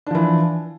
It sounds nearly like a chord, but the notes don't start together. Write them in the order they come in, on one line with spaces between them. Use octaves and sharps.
D4 F3 E3